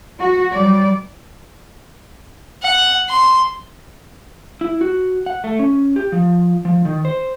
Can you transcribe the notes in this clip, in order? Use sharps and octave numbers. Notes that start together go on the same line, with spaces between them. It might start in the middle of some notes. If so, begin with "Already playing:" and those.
F#4
F#3 G3 D5
F#5
C6
E4
F#4
F#5
A3
C#4
G4
F3
F3
D#3
C5